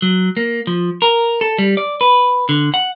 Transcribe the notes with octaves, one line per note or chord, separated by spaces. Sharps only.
F#3
A#3
F3
A#4
A4
G3
D5
B4
D3
F#5